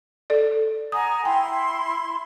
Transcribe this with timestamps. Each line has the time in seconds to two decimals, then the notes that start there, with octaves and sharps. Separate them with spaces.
0.30 A4 D5
0.92 F#5 G#5 A#5 D#6
1.25 E4 G5 C6